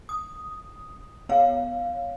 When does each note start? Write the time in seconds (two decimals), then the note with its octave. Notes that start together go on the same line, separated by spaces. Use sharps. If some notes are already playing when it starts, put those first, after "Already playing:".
0.09 D#6
1.29 B3 C#5 F5